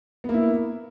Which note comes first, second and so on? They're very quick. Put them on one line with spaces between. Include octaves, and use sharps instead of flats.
B3 A#3 E4